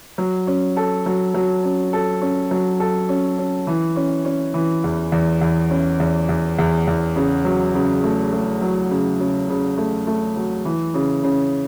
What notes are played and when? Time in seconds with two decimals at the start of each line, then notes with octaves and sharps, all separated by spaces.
0.18 F#3
0.47 C#4
0.77 A4
1.06 F#3
1.34 F#3
1.64 C#4
1.93 A4
2.21 C#4
2.51 F#3
2.80 A4
3.09 C#4
3.38 C#4
3.67 E3
3.96 C#4
4.25 C#4
4.54 E3
4.84 E2
5.12 E2
5.41 E2
5.70 C#4
6.00 E2
6.29 E2
6.58 E2
6.87 E2
7.16 C#3
7.45 F#3
7.75 C#3
8.04 A3
8.33 A3
8.61 F#3
8.90 C#3
9.20 C#3
9.49 C#3
9.78 A3
10.07 A3
10.36 F#3
10.65 E3
10.94 C#3
11.23 C#3